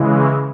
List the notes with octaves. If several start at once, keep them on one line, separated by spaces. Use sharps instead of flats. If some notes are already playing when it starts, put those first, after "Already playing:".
Already playing: C#3 E3 G#3